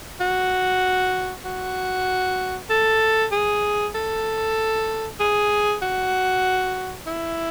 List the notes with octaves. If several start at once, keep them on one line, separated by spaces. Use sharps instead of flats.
F#4
F#4
A4
G#4
A4
G#4
F#4
E4